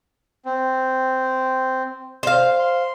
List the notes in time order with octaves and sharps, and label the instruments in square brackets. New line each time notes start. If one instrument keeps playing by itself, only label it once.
[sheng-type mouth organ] C4
[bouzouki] C5 F5
[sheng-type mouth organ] C6